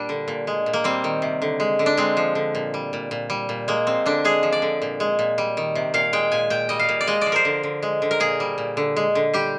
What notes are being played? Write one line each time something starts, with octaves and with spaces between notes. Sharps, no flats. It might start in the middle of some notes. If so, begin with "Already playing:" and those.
Already playing: A#2 G3 D4
D3
A#2
G#3
A#2
A#3
G3 C4
D#3
C3
D3
G#3
D3
D4
G#3 C4
F3
D3
A#2
G3
A#2
A#2
G3
A#2
G#3 A#3
F3 C4
D3 D4
G#3 G#4
F3
D5
D3
A#2
G#3
A#2
G3
D#3
C3
A#2 F5
G#3 G5
A#2 G#5
A#2 G5
G3 D#5
F5
A#2
D5
G#3 D#5
F3 D5
A#4 C5
D3
D3
G#3
D3
A#4
A#2 G#4
G3
A#2
D3
G#3
D3
G3 G4